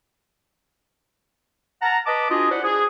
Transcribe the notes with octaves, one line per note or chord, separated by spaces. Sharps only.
F#5 A5 A#5
B4 D#5 A5 D6
D4 F4 F#4 G#4 D#5
E4 C5 D5 F#5
G#4